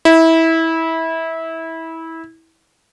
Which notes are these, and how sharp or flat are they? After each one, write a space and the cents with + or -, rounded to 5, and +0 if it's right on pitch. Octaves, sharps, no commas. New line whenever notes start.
E4 -20